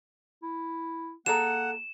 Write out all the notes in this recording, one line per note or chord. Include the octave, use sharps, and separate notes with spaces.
E4
A#3 G#4 A4 F#5 A#5 E7